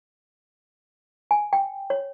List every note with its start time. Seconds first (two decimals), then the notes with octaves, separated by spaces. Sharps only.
1.31 G#5
1.53 G5
1.90 C#5